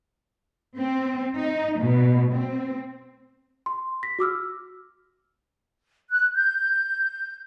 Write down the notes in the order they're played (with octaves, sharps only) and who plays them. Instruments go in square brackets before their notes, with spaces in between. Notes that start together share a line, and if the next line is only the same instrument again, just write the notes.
[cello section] C4
D#4
B2
C4
[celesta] C6
A#6 B6
F#4 D6 E6 F6
[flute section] F#6
G6